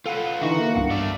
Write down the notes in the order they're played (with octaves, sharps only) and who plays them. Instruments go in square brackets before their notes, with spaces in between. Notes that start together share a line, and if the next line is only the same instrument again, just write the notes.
[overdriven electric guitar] F4 B4 [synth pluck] A4 F5 F#5
[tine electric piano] D3 E3 D#4 [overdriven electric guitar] F#4 [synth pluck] E5 C#6
[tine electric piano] A#3
[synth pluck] C2 B3 F5 [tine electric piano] G2
[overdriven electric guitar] A3 D5